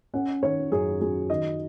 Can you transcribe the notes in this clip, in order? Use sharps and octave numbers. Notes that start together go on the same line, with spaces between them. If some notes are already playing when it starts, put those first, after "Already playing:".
C#4 F#5
D#3 C#5
F#2 G#4
F#3 G#4
D#3 D#5